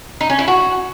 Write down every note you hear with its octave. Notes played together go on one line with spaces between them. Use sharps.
D#4
C#4
E4
F#4